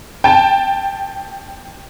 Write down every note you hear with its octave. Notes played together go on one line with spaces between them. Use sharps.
G5 A5